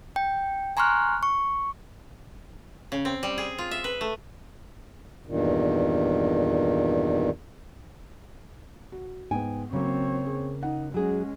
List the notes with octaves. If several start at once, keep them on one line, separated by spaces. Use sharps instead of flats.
G5
G#5 A#5 C6 C#6 F6 F#6
C#6
C#3
C4
G3
G#4
F4
E5
B4
A3
E2 G2 A#2 D#3
F#4
G#2 B3 G5 G#5
C#3 F#3 A#3 C4 C#5
G#4
D#4 F#5
F#3 G#3 C#4 G#4